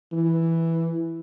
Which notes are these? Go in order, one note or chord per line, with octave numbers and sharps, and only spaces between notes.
E3